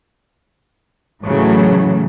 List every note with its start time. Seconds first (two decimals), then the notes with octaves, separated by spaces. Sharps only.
1.25 A2 C#3 E3 F#3 A3